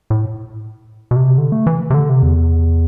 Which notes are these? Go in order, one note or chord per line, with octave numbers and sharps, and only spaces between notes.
A2
B2
C3
D3
A3
E3
C3
D3
C3
E2